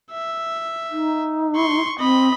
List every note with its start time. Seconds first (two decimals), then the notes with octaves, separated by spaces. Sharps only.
0.12 E5
0.91 D#4
1.56 C6 C#6
1.99 C4 D#5 B5